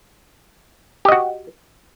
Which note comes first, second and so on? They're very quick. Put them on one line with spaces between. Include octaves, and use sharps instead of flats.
G4 D#5 F#4